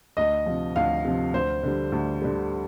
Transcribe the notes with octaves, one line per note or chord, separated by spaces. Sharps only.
D2 D#5
C3 F3
D2 F5
C3 F3
D2 C5
D3 G3
D2
D3 G3